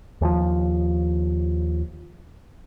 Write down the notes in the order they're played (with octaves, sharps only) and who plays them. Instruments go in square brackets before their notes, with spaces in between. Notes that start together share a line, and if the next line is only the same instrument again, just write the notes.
[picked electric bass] D#2 F3